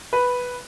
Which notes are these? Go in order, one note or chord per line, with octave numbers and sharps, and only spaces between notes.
B4